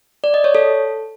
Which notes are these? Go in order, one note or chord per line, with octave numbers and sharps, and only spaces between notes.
D5
D#5
C#5
A4